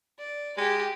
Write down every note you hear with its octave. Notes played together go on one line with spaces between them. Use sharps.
D5
G#3 G4